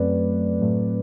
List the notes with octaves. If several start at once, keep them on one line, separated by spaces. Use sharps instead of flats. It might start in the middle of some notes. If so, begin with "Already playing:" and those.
Already playing: F#2 F#3 A3 C4 B4 D5
A2 F#3 A3 C4